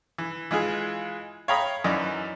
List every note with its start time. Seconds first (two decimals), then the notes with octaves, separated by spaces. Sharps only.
0.18 E3
0.51 E3 G#3 F4 G#4
1.48 C#5 F5 G5 A#5 B5 D#6
1.84 F#2 E3 D#4 D5